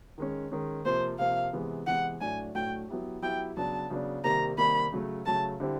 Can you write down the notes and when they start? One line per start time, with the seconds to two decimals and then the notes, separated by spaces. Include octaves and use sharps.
0.18 D#3 G#3 C#4
0.52 D#3 G#3 C#4
0.85 C3 F3 A#3 C5
1.19 C3 F3 A#3 F5
1.53 C3 E3 G#3 B3
1.87 C3 E3 G#3 B3 F#5
2.21 A2 F#3 A3 D4 F#4 G#5
2.55 A2 F#3 A3 D4 F#4 G5
2.89 F#3 B3 E4 G4
3.22 F#3 B3 E4 G4 G5
3.57 C#3 F#3 B3 D4 A5
3.90 C#3 F#3 B3 D4
4.24 C3 D#3 G3 A#3 A#5
4.58 C3 D#3 G3 A#3 B5
4.92 C#3 F#3 A3
5.26 C#3 F#3 A3 A5
5.60 D3 G3 C4 E4 G4